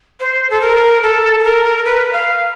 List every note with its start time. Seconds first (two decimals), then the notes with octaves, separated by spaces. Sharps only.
0.20 C5
0.50 A4
0.61 A#4
1.03 A4
1.39 A4
1.44 A#4
1.86 B4
2.13 F5